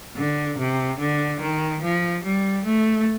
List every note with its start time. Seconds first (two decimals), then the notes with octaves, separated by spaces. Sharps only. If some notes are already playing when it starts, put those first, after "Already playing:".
0.16 D3
0.58 C3
1.00 D3
1.41 D#3
1.82 F3
2.24 G3
2.65 A3